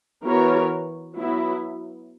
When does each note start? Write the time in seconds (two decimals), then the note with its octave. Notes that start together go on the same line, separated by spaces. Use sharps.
0.24 E3 B3 F#4 A#4 C#5
1.15 F#3 B3 E4